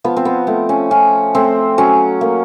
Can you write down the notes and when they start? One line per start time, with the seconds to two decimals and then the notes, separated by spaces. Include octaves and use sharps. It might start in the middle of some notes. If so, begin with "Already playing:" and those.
0.04 F3 B3
0.17 C4
0.25 B3
0.47 A3 C4
0.69 C#4
0.91 F3 C#4
1.35 A3 C4
1.78 F#3 C#4
2.21 A#3